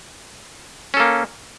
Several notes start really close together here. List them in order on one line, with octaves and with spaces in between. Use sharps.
C#4 A4 A#3